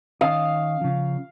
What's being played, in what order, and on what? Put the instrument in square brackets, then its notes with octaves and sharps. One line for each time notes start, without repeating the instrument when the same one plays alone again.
[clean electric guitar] D#3 C#4 D#5 [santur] F5
[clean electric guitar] C#3 F3